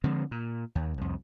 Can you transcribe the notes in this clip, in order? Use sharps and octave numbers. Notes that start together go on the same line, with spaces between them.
D3 F3 G#3 C4
A#2
D#2
C2 F2